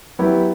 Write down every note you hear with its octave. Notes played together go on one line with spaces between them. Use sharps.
F#3 B3 E4 G4